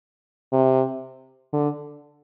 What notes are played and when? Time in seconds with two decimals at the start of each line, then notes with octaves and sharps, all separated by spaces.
0.52 C3
1.53 D3